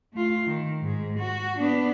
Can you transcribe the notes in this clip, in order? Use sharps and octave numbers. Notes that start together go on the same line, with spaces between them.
A3 F4
D#3
G#2 G#3
F#4
B3 D4